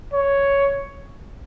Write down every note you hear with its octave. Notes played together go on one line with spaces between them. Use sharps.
C#5